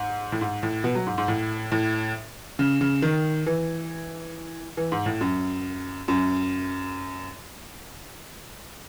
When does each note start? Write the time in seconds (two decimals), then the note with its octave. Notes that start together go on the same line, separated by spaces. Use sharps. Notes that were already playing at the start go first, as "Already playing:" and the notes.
Already playing: G#2
0.32 A2
0.41 G#2
0.63 A2
0.84 B2
0.95 F#3
1.07 G#2
1.18 G#2
1.28 A2
1.72 A2
2.59 C#3
2.81 C#3
3.02 D#3
3.46 E3
4.77 E3
4.92 G#2
5.06 A2
5.21 F#2
6.08 F#2